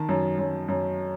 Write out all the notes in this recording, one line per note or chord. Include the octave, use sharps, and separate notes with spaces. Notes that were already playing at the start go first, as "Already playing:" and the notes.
Already playing: D#3 A5
F#2
F#2
F#2